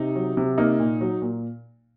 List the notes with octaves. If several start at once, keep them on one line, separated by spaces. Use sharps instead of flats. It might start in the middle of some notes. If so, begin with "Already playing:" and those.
Already playing: C3 D#4
F#3
C3
A#3 D#4
A#2
F#3
A#2